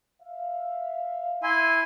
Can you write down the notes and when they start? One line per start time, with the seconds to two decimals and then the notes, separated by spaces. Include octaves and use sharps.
0.22 E5 F5
1.43 E4 G#5 C6